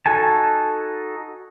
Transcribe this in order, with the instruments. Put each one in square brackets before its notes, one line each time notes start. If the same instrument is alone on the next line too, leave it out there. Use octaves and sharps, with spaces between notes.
[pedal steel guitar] D#4 F#4 A4 G#5 A5